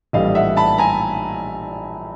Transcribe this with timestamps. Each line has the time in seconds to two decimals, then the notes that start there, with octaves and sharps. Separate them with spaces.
0.13 A#1 A2 E3 G3 D#5 F5
0.35 E5 F#5
0.57 A5 B5
0.78 G#5 A#5